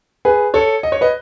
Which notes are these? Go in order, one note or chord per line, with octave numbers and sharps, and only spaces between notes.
G#4 B4
A4 C#5
D#5
C#5
B4 D#5